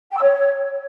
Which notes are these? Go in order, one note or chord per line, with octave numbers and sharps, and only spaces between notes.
G5
E6
C#5